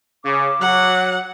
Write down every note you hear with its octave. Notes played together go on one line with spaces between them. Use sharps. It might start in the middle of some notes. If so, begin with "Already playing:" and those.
C#3 D6
F#3 F#5